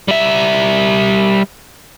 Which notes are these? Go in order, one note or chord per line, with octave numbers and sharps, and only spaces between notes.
G3 E5